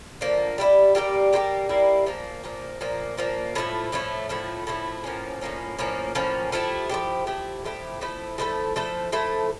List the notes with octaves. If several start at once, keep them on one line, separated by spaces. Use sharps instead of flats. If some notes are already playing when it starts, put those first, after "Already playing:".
D3 F3 A#3
G3 A#3 E4 G4
G3 A#3 E4 G4
G3 A#3 E4 G4
G3 A#3 E4 G4
A#2 F3 A#3
A#2 F3 A#3
A#2 F3 A#3
A#2 F3 A#3
A2 F3 A3 E4
A2 F3 A3 E4
A2 F3 A3 E4
A2 F3 A3 E4
A2 F3 A#3 C#4
A2 F3 A#3 C#4
A2 F3 A#3 C#4
A2 F3 A#3 C#4
F3 A3 E4 G4
F3 A3 E4 G4
F3 A3 E4 G4
F3 A3 E4 G4
F3 A3 E4 A4
F3 A3 E4 A4
F3 A3 E4 A4
F3 A3 E4 A4